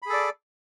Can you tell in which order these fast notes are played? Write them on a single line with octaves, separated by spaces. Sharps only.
B5 G#4 A4 D5